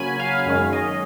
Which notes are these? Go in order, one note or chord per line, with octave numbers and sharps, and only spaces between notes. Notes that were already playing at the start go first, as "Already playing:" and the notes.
Already playing: C#3 F#3 A#3 C#4 G#5 B5
F5 G#5
F#2 D#3 G#3 C#4
D#5